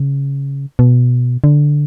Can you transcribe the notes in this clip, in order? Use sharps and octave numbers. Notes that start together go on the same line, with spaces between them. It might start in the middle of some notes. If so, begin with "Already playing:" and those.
Already playing: C#3
B2
D3